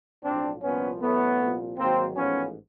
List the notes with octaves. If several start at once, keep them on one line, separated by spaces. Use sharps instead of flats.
B1 A2 F3 C4 D4
C2 A#2 F3 B3 C#4
A1 A2 F#3 A3 B3
C2 A#2 F3
G#1 G#2 D#3 F#3 A#3 C4
A1 G#2 F3 B3 C#4